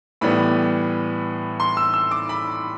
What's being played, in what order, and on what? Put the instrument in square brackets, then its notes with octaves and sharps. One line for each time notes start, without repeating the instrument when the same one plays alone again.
[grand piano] A2 E3 G3 B3 B5
C6
E6
E6
D6
B5